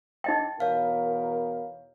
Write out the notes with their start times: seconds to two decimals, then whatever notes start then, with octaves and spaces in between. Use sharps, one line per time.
0.24 D#4 D#5 G5
0.60 E2 B2 A#4 C#5 F5